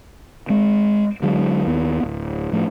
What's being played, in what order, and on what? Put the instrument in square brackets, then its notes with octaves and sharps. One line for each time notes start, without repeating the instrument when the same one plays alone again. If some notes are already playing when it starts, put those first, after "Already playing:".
[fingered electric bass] G#3 C4
D3 F#3 G#3
D#2 B3
D1
A2 F3 A3